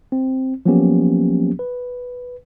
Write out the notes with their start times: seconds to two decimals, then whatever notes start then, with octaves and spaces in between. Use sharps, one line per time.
0.12 C4
0.66 F3 F#3 A#3 B3 C#4 G4
1.59 B4